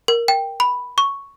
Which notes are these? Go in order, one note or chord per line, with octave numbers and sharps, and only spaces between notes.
A#4
G5
B5
C#6